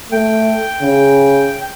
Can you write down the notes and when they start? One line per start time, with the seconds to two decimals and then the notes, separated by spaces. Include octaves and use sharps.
0.12 A3 G5
0.82 C#3